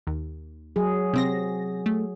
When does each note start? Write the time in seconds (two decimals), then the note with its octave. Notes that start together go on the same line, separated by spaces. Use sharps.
0.07 D#2
0.76 F#3 G#4
1.13 C3 C4 A#6
1.86 A3